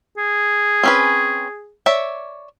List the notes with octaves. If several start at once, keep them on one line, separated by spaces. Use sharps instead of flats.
G#4
C4 C#4 B4
C#5 D5 E5